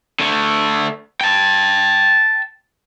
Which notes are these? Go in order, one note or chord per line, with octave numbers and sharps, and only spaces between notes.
D3 A3
G5 A5